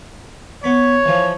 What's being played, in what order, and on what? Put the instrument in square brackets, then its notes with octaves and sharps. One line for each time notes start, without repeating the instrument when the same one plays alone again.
[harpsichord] B3 B5 [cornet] C#5
[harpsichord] E3 F3